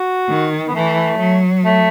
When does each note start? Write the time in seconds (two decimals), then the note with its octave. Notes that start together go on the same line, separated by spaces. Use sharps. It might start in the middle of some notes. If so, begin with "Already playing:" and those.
Already playing: F#4
0.31 D#3
0.68 B3
0.75 E3 A3
1.20 F#3
1.65 A3